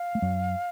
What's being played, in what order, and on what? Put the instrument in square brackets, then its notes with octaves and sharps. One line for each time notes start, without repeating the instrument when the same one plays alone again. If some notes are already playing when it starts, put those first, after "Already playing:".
Already playing: [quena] F5
[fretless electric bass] A3
F#2 F#3